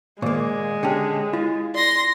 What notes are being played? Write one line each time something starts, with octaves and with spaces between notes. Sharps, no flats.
A#2 D#3 G#3 A#3
D3 C#4 G4 G5 A5
E4 F4
D5 C6 A#6